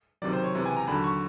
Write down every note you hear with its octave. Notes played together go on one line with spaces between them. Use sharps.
C#2 C3 D#3 F#3 D5
C5
C#5
C#2 C3 E3
G#5
A#5
D#2 D3 F#3 B5
C#6